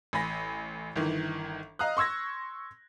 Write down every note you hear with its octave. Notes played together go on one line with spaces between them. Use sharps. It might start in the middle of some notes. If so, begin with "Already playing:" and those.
A1 G#5 B5 A#6
G1 D#3 E3
D#5 F5 A#5 D#6 F#6
C6 C#6 E6 G#6 A#6